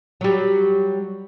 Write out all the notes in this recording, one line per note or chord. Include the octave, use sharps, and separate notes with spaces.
F#3 G3